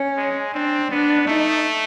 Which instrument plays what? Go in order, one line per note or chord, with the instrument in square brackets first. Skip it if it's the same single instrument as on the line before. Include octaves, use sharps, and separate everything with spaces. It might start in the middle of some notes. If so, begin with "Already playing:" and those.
Already playing: [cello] C#4
[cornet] G#3
[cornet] C4 [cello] D4
[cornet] B3 [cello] D4
[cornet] A3 [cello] D#4